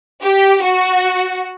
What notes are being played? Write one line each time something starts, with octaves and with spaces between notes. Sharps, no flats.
G4
F#4